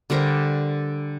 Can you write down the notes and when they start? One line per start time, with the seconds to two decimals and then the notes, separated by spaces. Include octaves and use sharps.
0.10 D3 G3 A#4 C5